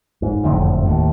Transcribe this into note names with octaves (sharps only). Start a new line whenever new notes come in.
G#2
F#1 F2 A2 D3
D#2 A2